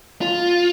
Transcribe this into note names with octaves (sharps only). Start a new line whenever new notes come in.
F4